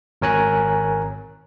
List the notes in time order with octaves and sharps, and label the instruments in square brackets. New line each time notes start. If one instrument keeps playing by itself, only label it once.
[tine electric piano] G#1 A#4 C#5 G#5 A#5 F#6